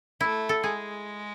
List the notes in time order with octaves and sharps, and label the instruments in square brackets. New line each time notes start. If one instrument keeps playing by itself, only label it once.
[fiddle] A3 [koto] E4
[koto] A4
[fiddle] G#3 [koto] G#4